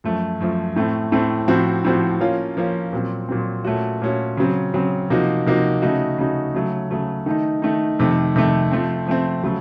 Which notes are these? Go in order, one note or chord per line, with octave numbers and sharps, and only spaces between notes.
F#2 F3 A3
F#2 F3 A3
A2 A3 C4
A2 A3 C4
A2 F3 C4 F#4
A2 F3 C4 F#4
F3 A#3 C#4 F4
F3 A#3 C#4 F4
A#2 F#3 C4
A#2 F#3 C4
A#2 A3 C#4 F#4
A#2 A3 C#4 F#4
C#3 F#3 C4
C#3 F#3 C4
C3 F3 A#3 D#4 F#4
C3 F3 A#3 D#4 F#4
C#3 A3 D#4 F#4
C#3 A3 D#4 F#4
C#3 F#3 A3
C#3 F#3 A3
D#3 A3 D#4
D#3 A3 D#4
F2 C3 D#3 A3
F2 C3 D#3 A3
F3 A3 C4
F3 A3 C4
C#3 F#3 A3